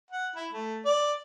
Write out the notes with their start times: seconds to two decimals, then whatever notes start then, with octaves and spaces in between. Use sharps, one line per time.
0.11 F#5
0.36 E4
0.53 A3
0.85 D5